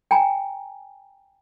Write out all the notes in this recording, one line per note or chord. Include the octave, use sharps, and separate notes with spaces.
G5 G#5 A#5